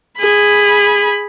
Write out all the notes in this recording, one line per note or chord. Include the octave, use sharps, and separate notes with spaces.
G#4 B5